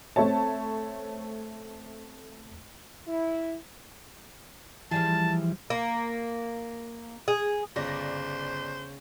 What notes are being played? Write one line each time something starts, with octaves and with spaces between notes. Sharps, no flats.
A3 C4 C#5 A5
E4
E3 F3 G3 G#4 A5
A#3
G#4
G1 C#3 C5 D5 A#6